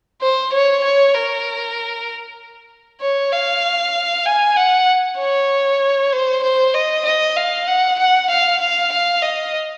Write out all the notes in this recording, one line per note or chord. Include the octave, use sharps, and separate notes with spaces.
C5
C#5
C#5
A#4
C#5
F5
G#5
F#5
C#5
C5
C5
D#5
D#5
F5
F#5
F#5
F5
F5
F5
D#5